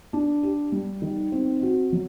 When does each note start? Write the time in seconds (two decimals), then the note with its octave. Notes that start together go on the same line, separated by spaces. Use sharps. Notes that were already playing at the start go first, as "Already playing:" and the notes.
0.13 D4
0.43 G4
0.72 G3
1.02 D#3
1.32 C4
1.63 F#4
1.93 F#3